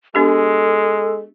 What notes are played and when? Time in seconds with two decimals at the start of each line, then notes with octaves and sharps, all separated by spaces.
0.15 G#3 B3 D4 G4 A4